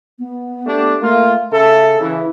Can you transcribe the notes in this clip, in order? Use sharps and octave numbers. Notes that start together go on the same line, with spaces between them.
B3
A3 D4 G4
A3 A#3 F4
C#3 A4 E5
C#3 E3 E4